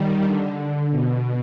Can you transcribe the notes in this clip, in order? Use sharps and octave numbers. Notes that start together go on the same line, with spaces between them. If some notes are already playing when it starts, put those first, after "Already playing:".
Already playing: D#3 G3
D3
B2